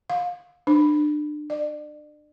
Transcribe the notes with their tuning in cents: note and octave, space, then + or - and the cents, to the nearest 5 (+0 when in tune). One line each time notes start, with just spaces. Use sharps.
F5 +25
D4 +30
D5 +35